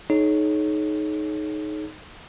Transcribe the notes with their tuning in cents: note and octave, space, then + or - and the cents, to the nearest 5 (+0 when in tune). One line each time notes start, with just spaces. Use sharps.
D#4 +0 G#4 +40 C#5 +0